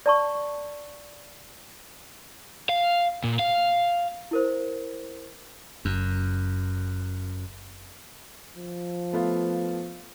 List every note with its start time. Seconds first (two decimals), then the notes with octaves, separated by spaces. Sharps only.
0.06 D5 A5 C#6
2.69 F5
3.24 A#2
3.39 F5
4.31 E4 A#4 C5
5.85 F#1 F#2
8.56 F3
9.13 A3 B3 F4